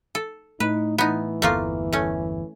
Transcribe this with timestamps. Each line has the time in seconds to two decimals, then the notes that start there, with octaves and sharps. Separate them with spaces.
0.15 A4
0.60 A2 D#4 B4
0.98 E3 B3 D#4
1.42 G1 E2 A3 A#3 F4
1.93 A3 C#4